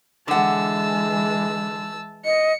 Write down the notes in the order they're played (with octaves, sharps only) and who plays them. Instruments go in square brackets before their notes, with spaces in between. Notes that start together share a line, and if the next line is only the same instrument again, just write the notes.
[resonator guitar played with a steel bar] D3 F#5 [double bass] E3 G#3 [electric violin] A5 E6
[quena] D#5 [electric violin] C#7